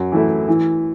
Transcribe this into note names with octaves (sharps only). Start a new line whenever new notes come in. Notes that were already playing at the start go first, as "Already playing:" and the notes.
Already playing: F#2
E3 A3 E4
E3